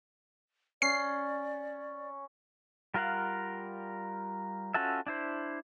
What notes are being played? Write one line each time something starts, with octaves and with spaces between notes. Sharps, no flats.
C#4 D5 C7
G3 F4 A#4 F5 F#5
C#4 F4 F#4 A4 E5
D4 E4 C5